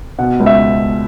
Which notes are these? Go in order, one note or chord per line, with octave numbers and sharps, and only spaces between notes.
B2 F#5
C#2
E5